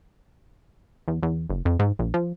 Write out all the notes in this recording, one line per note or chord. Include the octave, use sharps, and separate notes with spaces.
E2
E2
F#1
F2
G#2
A#1
F3